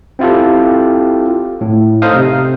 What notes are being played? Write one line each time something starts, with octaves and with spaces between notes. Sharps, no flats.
C4 E4 F4 G4 A4
A2
D#4 A4 C5 D#5 F5 D#6
C3